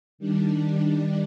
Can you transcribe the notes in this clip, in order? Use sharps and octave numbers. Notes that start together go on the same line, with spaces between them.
D#3 G3 D4